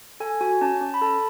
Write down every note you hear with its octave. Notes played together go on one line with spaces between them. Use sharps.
A4 G#5
F#4 G#5
C#4 A5
C#4
B5
A4 A5